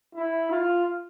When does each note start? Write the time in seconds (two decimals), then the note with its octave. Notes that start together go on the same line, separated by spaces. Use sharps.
0.15 E4
0.51 F4